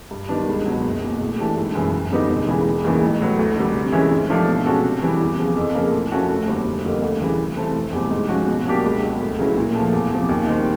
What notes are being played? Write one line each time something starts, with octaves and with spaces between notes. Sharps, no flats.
G2
D#3 G3 B3 D4
C#2
B2 F#3
F#1
E2 B2
A2
E3 A3 D4 G4
G#1
F#2 C#3 E3
F#2
D3 G3 B3 D#4
E1
E2 C#3 E3 G#3
E1
D#2 C#3 E3 G#3
A1
A2 F#3 B3
D2
D3 G3
C3
E3 G#3 C#4 E4
G#2
F3 A3 D4 G4
B2
G#3 C#4 F#4 A4
C3
E3 G3
E2
C#3 F3
F2
C#3 F3 A#3
A2
F3 A3 C#4 F#4
F1
D#2 D3 G3 C4
F1
F2 D3 G3 A#3
D2
C#3 E3 G3
C3
E3 A3 C4
F1
E2 B2 G3 C4
G#2
F3 G#3 C#4 F#4
B2
F#3 A#3 D4 G4
C#2
B2 F#3
D2
C#3 F#3 B3 E4
A#2
A3
F3
E2
C3 F3
D#2
D#3 G3 C4